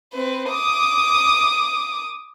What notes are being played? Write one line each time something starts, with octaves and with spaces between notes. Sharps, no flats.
C4 B4
D6 D#6